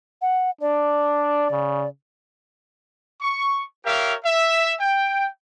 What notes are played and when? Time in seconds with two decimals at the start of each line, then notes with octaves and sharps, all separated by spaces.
0.22 F#5
0.61 D4 D5
1.51 C#3
3.21 C#6
3.85 G4 A#4 C#5 E5 F5
4.25 E5
4.80 G5